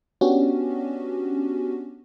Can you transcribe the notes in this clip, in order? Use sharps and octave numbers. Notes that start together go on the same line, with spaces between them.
B3 C#4 D4 F#4 G4